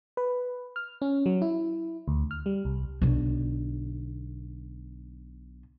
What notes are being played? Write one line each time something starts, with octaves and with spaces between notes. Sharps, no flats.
B4
F6
C#4
F#3
E4
D2
F6
G3
C2
B1 D3